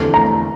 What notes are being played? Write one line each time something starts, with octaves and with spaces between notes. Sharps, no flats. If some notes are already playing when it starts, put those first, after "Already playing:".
Already playing: F1 E2 D3 A3 C4
A#5